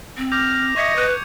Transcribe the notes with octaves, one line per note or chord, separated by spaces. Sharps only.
C4
D6 F6 G6 A#6 F7
D#5 E5 C#6 G#6 C#7
B4